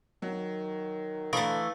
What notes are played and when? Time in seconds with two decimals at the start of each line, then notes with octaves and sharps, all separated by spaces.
0.22 D#3 F#3
1.33 D3 E3 A3 F5 A#5 B5 C#6 D#6